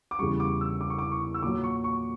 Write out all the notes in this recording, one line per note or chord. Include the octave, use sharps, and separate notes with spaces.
D6
E2 C#3 G3 C#6
D6
E6
D6
C#6
D6
C#6
E6
A#2 F#3 D6
C#6
C#6